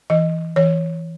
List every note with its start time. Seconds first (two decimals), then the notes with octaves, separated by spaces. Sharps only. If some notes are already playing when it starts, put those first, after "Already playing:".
0.10 E3 D#5
0.56 E3 C#5